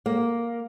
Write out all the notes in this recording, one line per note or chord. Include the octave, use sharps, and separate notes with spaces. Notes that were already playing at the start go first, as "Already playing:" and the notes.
A#3